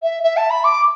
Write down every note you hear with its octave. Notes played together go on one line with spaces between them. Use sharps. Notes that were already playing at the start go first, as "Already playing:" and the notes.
E5
E5
A5
B5
D6